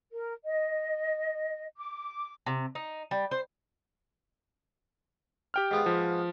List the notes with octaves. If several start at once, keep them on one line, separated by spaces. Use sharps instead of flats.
A#4
D#5
D6
C3
D#4
G3
C5
G4 G5 F6
G#2 B3 F4
F3